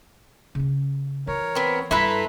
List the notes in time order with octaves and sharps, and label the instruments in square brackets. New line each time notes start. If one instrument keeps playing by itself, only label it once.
[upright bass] C#3 C#4
[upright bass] E3 [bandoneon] A#4 C#5
[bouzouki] B3 C4
[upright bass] G2 [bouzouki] E4 A4 B4 [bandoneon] E5 A#5 C6